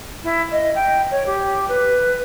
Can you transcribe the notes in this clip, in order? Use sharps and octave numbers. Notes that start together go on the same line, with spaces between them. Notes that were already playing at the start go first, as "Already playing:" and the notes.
E4
D#5
G5
C#5
G4
B4